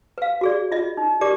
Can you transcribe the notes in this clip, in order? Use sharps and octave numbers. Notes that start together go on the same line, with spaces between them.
B4 F5
F#4 G#4 D5
F4 D#5
D#4
G4 A#4 D5 D6